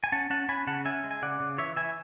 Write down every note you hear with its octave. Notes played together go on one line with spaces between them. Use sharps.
G#5
C#4 F#5 A5
C#4 F#5 A5
C#4 G#5 B5
C#3 F#5 A5
C#4 E5 G#5
G#3
G#5
C#3 D5 F#5
C#3
E3 C#5 E5
E3 E5 G#5